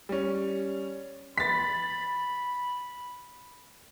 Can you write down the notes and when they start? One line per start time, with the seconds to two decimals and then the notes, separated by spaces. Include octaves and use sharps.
0.09 G3 C#4
1.38 B5 A6 B6